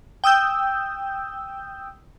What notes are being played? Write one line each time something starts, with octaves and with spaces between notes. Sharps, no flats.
G5 D#6 E6 G6